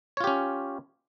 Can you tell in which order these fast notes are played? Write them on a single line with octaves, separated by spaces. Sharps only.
C#5 F4 G4 C#4